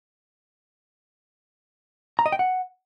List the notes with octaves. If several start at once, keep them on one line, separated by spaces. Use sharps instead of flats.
A#5
D#5
G5
F#5